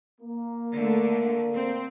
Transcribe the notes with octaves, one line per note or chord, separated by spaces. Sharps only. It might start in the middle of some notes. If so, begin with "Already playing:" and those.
A#3
D3 A3
C4